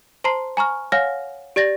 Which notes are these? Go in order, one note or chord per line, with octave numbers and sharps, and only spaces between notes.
C5 A5 A#5 C6 C7
G#5 A#5 C#6 F6
C#5 F5 F#5 G#5 F6 A#6
G4 D5 A6 A#6